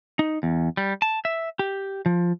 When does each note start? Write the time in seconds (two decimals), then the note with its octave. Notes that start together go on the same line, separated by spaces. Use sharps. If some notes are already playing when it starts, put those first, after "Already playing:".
0.19 D#4
0.43 E2
0.77 G3
1.02 A5
1.25 E5
1.59 G4
2.06 F3